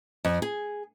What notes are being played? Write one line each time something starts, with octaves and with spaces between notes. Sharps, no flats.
F2
G#4